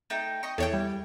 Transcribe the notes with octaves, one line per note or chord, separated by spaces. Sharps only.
A3 D#4 G5
D#5 C#6
E2 E4 A4 C#5 G5
G3